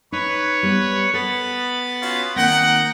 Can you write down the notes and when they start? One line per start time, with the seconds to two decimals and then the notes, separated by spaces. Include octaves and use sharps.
0.12 D#4 B4 C#5
0.63 G3 B3
1.14 B3 A4 B5 A6
2.01 C#4 F4 F#4
2.36 D#3 A#3 C4 D#4 F#5 G5 A#6